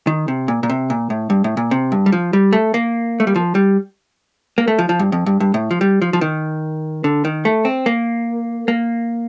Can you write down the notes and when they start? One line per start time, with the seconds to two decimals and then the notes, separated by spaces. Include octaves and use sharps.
0.07 D#3
0.28 C3
0.48 A#2
0.63 A#2
0.69 C3
0.90 A#2
1.10 A2
1.30 G2
1.44 A2
1.57 A#2
1.71 C3
1.92 G2
2.06 G3
2.12 F3
2.33 G3
2.53 A3
2.74 A#3
3.20 A3
3.27 G3
3.36 F3
3.55 G3
4.58 A#3
4.68 A3
4.79 F3
4.89 F3
4.99 G2
5.12 F2
5.26 G2
5.40 G2
5.54 A2
5.71 F3
5.81 G3
6.02 F3
6.13 F3
6.21 D#3
7.04 D3
7.25 D#3
7.45 A3
7.65 C4
7.86 A#3
8.68 A#3